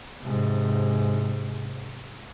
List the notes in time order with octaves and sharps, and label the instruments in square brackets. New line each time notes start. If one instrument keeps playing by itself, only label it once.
[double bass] G#2 C3